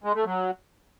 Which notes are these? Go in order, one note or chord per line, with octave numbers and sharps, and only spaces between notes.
G#3
A3
F#3